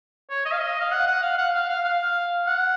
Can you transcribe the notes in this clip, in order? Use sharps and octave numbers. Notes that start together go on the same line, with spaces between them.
C#5
D#5
F5
D#5
F5
F#5
F#5
F5
F#5
F5
F5
F5
F#5